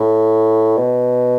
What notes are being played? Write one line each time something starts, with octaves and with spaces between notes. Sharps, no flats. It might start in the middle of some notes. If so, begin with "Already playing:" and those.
Already playing: A2
B2